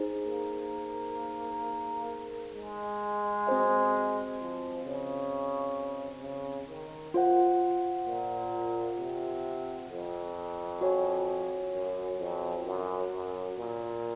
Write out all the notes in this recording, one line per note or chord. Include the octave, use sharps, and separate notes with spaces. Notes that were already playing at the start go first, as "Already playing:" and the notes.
Already playing: D#4 G#4 C5
A#3
G#3
C4 F#4 C5 D#5
F3
C#3
C#3
D#3
F4 C5 F#5
A#2
C3
F2
F#4 C#5 G#5
F#2
F2
F#2
F#2
A#2